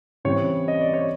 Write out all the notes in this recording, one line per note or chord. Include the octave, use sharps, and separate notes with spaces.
C#3 E3 G3 C4 C#5
D#5
D5
C#5